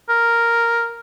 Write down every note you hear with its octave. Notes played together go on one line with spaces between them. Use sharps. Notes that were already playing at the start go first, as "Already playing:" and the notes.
A#4